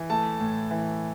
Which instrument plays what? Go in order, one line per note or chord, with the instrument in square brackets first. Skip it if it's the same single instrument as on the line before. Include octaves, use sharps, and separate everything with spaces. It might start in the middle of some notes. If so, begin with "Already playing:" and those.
Already playing: [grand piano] E3
A3 A5
A2
E3